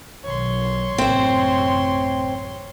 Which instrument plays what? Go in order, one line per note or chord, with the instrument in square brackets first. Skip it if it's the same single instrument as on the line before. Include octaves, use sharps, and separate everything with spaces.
[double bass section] B1 D#3 [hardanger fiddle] C#5 C6
[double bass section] A1 F#2 C3 [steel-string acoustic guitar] C4 C5